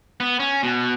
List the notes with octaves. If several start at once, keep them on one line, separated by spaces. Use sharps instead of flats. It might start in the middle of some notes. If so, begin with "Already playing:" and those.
B3
C#4
B2